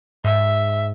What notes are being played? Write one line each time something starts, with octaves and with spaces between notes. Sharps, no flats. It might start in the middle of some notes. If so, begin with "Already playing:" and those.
G#2 E5